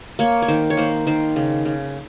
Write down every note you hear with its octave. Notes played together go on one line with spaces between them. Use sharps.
A#3 C#5
C#5
D#3 C5
C#5
A#3 C5
D#3 C5
C#3
C#3